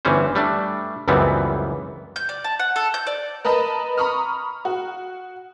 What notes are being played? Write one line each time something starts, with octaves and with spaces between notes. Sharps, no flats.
G1 E3 G3 C#4 C5
G3 A3 D4
C#2 F#2 E3 G3 B3 C4
G6
D5
A5
F#5
A4
G6
D5
A#4 B4 D#5 A5 B5
A#5 B5 C#6 D#6 F6
F#4